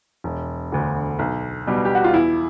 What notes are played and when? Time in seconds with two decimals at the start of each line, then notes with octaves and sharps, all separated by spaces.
0.24 E1
0.72 D2 D3
1.19 B1
1.67 B2 G3
1.85 G4
1.95 F#4
2.04 F4
2.14 E2 E4